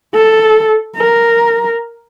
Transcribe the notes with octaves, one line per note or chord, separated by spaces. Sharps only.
A4
A#4